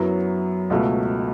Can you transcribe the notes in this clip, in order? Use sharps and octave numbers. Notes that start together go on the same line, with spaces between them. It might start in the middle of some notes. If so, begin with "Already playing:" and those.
Already playing: F#2 F#3 B3 E4
C#2 B2 A3